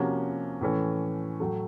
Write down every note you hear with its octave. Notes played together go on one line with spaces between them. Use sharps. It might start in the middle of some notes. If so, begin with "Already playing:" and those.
Already playing: C3 F3 A#3 C#4 F#4
A2 E3 A3 C#4
A2 F#3 A3